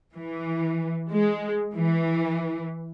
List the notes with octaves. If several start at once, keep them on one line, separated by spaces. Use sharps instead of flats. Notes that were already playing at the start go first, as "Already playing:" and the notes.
E3
G#3
E3